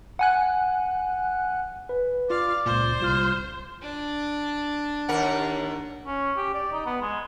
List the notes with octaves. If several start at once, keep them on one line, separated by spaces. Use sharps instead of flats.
F#5 G#5 F#6
B4
F4 D5 F5
C#2 A#2 C5
C2 F4 F6
D4
D#2 A#4 F#5
C#4
G4
D5
D#4
B3
G#3